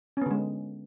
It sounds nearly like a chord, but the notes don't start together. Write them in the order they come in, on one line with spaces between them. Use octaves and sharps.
C#4 B3 D3 G#3